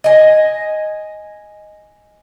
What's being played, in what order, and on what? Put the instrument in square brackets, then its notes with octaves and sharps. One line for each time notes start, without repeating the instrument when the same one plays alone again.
[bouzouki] D#5 G#5